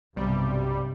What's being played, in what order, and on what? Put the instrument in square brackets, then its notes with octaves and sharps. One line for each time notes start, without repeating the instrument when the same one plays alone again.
[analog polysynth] B1 G3 [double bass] G2 C3